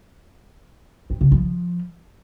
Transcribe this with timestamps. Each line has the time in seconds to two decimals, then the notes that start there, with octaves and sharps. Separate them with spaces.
1.10 C4
1.21 C#3
1.32 F3